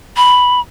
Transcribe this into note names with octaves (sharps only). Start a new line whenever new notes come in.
B5